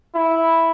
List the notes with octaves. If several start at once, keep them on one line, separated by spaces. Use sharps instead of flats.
E4